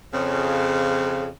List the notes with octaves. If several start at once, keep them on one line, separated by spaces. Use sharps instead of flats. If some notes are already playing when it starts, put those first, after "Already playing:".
F2 C#3